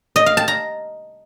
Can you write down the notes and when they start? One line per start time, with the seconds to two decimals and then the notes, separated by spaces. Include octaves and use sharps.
0.16 D#5
0.26 F5
0.37 A5
0.48 A#5